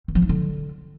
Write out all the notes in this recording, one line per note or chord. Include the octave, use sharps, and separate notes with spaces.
D#3
F3
D#4
D3